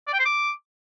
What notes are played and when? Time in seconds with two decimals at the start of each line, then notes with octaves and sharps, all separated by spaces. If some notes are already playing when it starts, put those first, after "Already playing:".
0.07 D5
0.13 G5
0.19 C5
0.26 D6